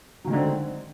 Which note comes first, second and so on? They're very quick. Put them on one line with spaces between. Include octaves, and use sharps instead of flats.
F#3 D#3 G#3 D3 C4